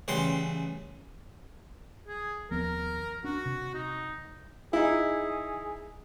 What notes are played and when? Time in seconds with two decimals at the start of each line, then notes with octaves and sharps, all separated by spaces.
0.08 A1 C#3 G3 F#5 G5 C6
2.07 G#4
2.51 D#2 F3 B3 A#4
3.24 D4 F#4
3.46 C3
3.74 D#4
4.73 D#4 E4 G#4